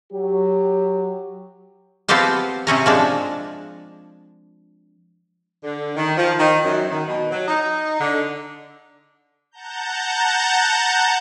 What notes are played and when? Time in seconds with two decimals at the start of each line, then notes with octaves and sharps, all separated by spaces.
0.12 F#3 G4
2.09 F3 B3 C4 F4 G4 C5
2.67 C3 C4 C#4 A#5
2.86 F3 G#3 D4
5.63 D3
5.95 D#3
6.16 F3
6.38 D#3
6.64 F#2
6.88 D#3
7.06 B2
7.31 F#3
7.47 D#4
7.99 D3
9.51 F#5 A5 A#5 G6